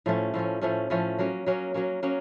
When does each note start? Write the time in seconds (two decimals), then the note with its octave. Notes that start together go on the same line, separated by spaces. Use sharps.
0.06 A2 F3 A3 C#4
0.34 A2 F3 A3 C#4
0.61 A2 F3 A3 C#4
0.90 A2 F3 A3 C#4
1.19 F#3 A#3 C#4
1.46 F#3 A#3 C#4
1.74 F#3 A#3 C#4
2.03 F#3 A#3 C#4